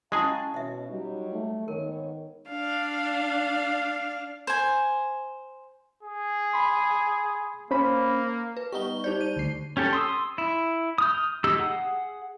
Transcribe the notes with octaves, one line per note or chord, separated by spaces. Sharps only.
G#3 C#4 E4 G#4 F5 F#5 A5 C#6
B2 C#4 D#5 E5
F#3 G3 D#4
A3
G#2 D#3 B3 A#4 C#5
D4 F5
C5 G#5
G#4
B5 C6
A#3 C#4 C5 B5
B4
G3 B3 D#4 C#6 G7
G3 D#4 C5 D5 G6
D#7
D2 C7
C#4 G4 A4
C6 D#6 E6
E4
D#6 F6 G6
D#4 G4 E6
G#4 F#5